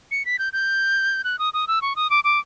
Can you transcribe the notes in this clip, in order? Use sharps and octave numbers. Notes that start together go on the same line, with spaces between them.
C#7
B6
G6
G6
F#6
D#6
D#6
E6
C#6
D#6
D6
D6